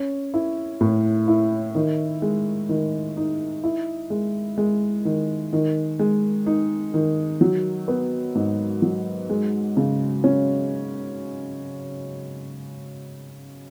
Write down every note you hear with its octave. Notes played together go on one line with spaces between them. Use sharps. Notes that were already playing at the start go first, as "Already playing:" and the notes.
Already playing: C#4
E4
A2
E4
D#3
G#3
D#3
D#4
E4
G#3
G#3
D#3
D#3
G#3
D#4
D#3
F#3
B3
G#2
F#3
G#3
C#3
C#4